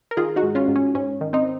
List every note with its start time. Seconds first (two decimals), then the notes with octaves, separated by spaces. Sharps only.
0.11 A#4
0.17 D#3 F4 G#4
0.36 D#4 F#4
0.43 G#2
0.55 C#4 F4
0.68 G#2
0.76 C#4
0.95 G#2 C#4
1.21 D#3
1.33 C4 D#4